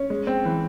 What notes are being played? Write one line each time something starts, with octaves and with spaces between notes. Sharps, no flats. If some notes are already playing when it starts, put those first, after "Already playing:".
Already playing: C#4
G#3
C4
E3